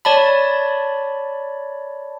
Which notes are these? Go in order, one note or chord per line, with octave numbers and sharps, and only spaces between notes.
C#5 D5 A5 B5